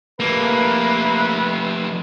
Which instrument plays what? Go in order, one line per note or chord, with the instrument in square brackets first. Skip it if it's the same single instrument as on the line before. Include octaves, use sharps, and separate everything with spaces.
[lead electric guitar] F3 A3 [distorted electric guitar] A#3 [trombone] B4